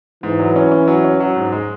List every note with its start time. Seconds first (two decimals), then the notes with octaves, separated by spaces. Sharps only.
0.23 G#2 E3
0.39 F#3
0.56 C#4
0.72 C#4
0.88 F#3
1.04 C#4
1.20 F#3
1.36 G#2
1.52 G#3